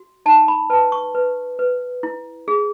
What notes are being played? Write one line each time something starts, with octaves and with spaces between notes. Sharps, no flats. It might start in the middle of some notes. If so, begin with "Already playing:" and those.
Already playing: F#4
D#4 A5
B5
B4 A5
C#6
B4
B4
E4
G#4